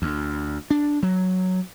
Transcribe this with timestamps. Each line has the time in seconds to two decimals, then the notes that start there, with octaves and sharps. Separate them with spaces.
0.02 D2
0.70 D4
1.03 F#3